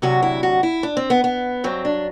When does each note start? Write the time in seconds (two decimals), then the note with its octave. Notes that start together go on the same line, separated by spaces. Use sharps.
0.02 D2 C3 F#3 F#4
0.23 E4
0.43 F#4
0.63 E4
0.83 D4
0.97 C4
1.10 B3
1.24 B3
1.64 G2 F#3 C4
1.85 D4